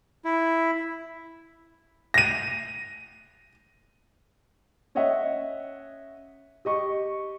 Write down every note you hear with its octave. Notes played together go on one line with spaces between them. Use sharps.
E4
A#6 D#7
C#4 C#5 D#5 E5 F#5
G4 D#5 C#6